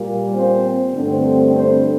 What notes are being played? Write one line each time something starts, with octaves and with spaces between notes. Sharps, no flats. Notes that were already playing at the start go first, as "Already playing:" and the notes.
Already playing: A#2 G3 A#3
C4 C5
G2 D3 A3 C4
C4 C5